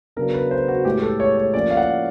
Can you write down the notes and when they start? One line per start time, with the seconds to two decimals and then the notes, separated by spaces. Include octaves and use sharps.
0.16 C#3 F#3 B3 D4 A#4
0.34 B4
0.51 C5
0.68 F#4
0.85 A2 E3 G#3 G4
1.02 A4
1.20 C#5
1.38 C#5
1.54 F3 A#3 C#4 E4 D5
1.70 F5
1.77 F#5